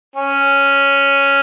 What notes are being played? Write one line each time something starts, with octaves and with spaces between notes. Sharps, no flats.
C#4